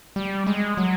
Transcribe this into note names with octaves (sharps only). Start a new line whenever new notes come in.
G3
G#3
F#3